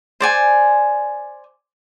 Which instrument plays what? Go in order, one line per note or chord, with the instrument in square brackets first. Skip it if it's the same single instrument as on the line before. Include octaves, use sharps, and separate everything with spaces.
[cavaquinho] C5 D5 G#5